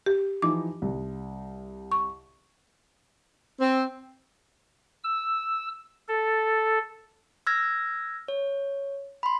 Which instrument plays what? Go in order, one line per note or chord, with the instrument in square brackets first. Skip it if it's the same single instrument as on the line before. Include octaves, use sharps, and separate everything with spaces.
[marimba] G4
[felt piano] E3 F3 D#4 [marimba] D6
[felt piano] C2
[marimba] C#6
[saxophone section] C4
[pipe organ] E6
A4
[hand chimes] E6 F6 G#6 A#6
C#5
B5 C6